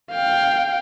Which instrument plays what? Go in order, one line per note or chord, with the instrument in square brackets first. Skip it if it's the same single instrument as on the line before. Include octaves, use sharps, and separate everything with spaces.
[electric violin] F5 G5